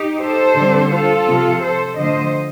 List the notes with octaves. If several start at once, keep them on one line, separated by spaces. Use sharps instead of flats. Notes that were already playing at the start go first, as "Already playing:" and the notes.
Already playing: D#4 G4
A4 C5
D3 G3 C4
F4 A4
C3 F3 C4
A4 C5
D3 F3 A3 C5 D#5